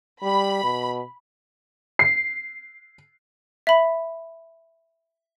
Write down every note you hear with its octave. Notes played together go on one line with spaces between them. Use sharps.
G3 B5
B2
C7
E5 B5